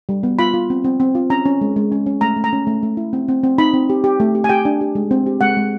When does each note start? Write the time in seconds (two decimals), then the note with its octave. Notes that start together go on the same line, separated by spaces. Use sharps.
0.09 G3
0.23 B3
0.39 F4 B5
0.54 F4
0.70 C4
0.84 C4
1.00 C4
1.15 F4
1.30 C#4 A#5
1.45 C#4
1.61 G#3
1.76 G#3
1.92 C#4
2.06 C#4
2.21 A3 A#5
2.36 A3
2.44 A#5
2.53 C#4
2.67 A3
2.83 A3
2.97 E4
3.13 C4
3.28 C4
3.43 C4
3.58 D#4 B5
3.73 C4
3.90 G4
4.04 G4
4.20 A3
4.35 G4
4.44 G#5
4.49 G4 G5
4.65 D4
4.81 G4
4.95 G#3
5.11 C4
5.26 G4
5.41 G#3 F#5
5.57 G#3